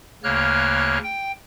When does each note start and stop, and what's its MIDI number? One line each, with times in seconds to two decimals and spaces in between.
0.24 0.98 38
0.24 0.98 49
0.24 0.98 58
0.24 0.98 73
0.24 0.98 89
0.24 0.98 90
1.03 1.32 79